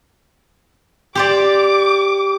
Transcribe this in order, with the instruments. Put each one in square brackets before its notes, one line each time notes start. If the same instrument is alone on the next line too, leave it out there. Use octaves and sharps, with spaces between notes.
[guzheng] G4 C5 D5 [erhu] D6